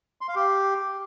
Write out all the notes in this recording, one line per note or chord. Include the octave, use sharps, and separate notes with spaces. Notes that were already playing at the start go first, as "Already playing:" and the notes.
C6
F5
G4